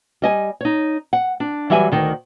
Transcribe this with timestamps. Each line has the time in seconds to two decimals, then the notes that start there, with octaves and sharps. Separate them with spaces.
0.22 G3 D#5 G#5
0.61 D#4 C#5
1.13 F#5
1.40 D4
1.70 E3 F#3 G3 E5 F5 G#5
1.92 D2 D#3 A#4